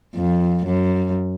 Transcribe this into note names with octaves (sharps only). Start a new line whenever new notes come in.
F2
F#2